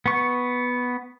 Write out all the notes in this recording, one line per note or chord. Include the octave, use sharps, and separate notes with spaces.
B3 C#6